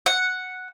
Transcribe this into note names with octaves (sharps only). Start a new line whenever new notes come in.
F#5